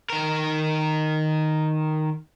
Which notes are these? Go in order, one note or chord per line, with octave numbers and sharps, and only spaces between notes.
D#3 A#4